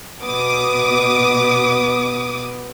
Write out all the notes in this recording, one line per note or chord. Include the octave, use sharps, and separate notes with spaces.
B2 B3 D6 D#6